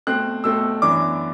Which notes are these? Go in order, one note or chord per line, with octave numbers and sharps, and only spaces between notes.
B2 A3 C4 F#6
B2 A3 C4 E6
F#2 E3 B3 D4 D6